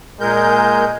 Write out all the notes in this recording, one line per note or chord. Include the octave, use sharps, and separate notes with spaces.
A#2 G#3 A#4 G6